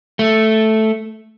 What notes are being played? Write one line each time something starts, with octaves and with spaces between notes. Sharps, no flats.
A3